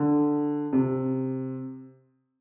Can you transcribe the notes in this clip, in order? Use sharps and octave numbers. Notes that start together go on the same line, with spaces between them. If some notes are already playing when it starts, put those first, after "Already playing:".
Already playing: D3
C3